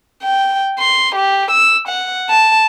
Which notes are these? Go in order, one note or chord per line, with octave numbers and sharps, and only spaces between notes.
G5
C6
G4
E6
F#5
A5